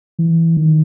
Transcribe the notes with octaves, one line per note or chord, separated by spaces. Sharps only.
E3
D#3